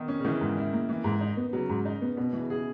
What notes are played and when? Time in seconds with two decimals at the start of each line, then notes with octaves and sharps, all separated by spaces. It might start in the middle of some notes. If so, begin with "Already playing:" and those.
Already playing: D#3 B3
0.08 C#4
0.20 C#3
0.25 D#3 E3
0.41 G#2
0.57 E4
0.73 A#3
0.89 E3
1.04 G#2
1.21 D#4
1.37 B3
1.53 C#3 F#3
1.69 G#2
1.85 D#4
2.02 B3
2.17 B2 B3
2.33 E3
2.39 C#3
2.50 G#4